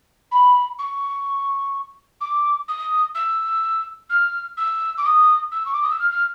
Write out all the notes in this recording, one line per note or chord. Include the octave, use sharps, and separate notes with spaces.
B5
C#6
D6
D#6
E6
F6
E6
D6
D#6
E6
C#6
D6
D#6
E6
F6
F6